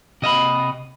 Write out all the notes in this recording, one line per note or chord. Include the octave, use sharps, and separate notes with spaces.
C3 D#5 E5 B5